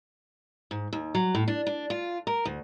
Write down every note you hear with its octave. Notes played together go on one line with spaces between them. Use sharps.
G#2
D#2
F#3
A2
D4
D4
F4
A#4
D2